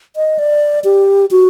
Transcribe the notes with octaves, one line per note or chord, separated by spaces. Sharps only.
D#5
D5
G4
F#4